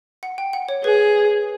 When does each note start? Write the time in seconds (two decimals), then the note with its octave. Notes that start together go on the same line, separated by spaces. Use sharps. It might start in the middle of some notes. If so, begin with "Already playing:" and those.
0.23 F#5
0.38 G5
0.53 F#5
0.69 C#5
0.84 G#4 B4